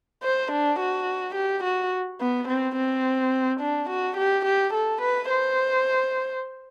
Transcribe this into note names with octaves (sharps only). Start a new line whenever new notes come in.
C5
D4
F#4
G4
F#4
B3
C4
C4
D4
F#4
G4
G4
A4
B4
C5